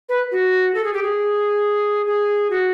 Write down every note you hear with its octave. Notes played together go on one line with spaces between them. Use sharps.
B4
F#4
A4
G#4
G4
G#4
G#4
F#4